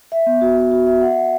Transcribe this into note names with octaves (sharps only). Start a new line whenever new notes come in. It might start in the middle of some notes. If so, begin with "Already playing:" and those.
E5
B3
F#4
E5
F#4
E5
F#5
F#5